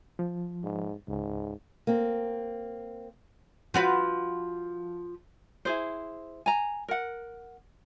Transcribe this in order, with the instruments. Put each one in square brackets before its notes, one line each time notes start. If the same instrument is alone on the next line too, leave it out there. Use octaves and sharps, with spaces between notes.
[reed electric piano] F3
[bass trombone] G#2
[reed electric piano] C#2 [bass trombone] G#2
[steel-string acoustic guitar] A#3 C4
[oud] F3 F#4 B4
[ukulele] E4 G#4 C5
G#5 A#5
A#4 F#5